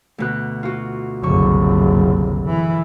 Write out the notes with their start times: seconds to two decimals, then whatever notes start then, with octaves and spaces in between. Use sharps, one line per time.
0.18 D2 B2 F#6
0.63 F4 F#4
1.23 F#1 C2 D3 C#6
2.46 E3